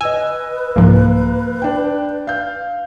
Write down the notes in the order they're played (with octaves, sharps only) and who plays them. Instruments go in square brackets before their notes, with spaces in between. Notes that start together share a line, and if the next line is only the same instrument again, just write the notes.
[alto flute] B4 [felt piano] D#5 E6 [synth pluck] G#5
[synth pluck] C2 G#2 F3 [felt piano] A#3
[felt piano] D4 G5
F5 G6